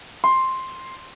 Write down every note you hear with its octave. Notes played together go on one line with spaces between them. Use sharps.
C6